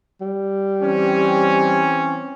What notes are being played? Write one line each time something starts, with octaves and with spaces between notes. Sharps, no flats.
G3
E3 C4 C#4